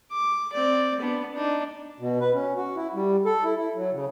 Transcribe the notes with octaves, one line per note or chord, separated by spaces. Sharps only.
D6
C4 D5
B3 D4
D4 D#4
B2
B4
C#4
F#4
E4
G3
A4
E4
E4
F#3
C#3